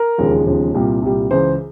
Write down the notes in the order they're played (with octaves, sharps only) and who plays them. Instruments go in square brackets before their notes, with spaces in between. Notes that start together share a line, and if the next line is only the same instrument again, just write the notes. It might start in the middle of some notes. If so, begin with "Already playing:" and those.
Already playing: [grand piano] A#4
E1 D#2 C#3 F3 G#3
E1 D#2 C#3 F3 G#3
C2 A#2 G3
C2 A#2 G3
C#2 C#3 E3 C5